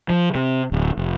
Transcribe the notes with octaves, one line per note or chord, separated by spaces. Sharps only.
F3
C3
D1
F1